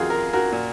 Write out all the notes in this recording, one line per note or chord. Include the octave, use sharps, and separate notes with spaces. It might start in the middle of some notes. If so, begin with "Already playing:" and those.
Already playing: F2 D#3 F4 F#4 G#4
A#4
F#4 A#4
A#2